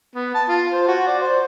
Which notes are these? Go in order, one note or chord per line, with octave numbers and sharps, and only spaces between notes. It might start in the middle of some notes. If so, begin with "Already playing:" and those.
B3
A5
F4
C5
F#4
D5
C5